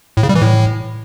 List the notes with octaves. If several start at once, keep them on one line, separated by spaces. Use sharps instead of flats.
A2
C#3
G3
E3
A2